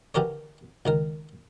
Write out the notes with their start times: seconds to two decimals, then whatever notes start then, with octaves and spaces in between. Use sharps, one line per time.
0.15 D3 E3 G4 A#4 C#5
0.85 C#2 D#3 A#4